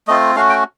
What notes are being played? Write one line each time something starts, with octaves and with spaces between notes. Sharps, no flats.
A3 C4 F4 D#5
A3 C#4 F#4 F5
G5